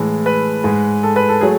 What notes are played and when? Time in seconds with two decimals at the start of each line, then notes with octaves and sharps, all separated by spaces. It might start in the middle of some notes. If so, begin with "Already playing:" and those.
Already playing: A2 E3 G#3
0.26 B4
0.64 G#2 G#3
1.03 A4
1.16 B4
1.29 A4
1.41 F#3 A3 G#4